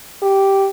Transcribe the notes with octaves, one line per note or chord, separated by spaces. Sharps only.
G4